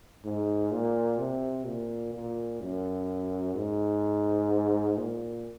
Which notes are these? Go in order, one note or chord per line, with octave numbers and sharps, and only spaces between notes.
G#2
A#2
C3
A#2
A#2
F#2
G#2
A#2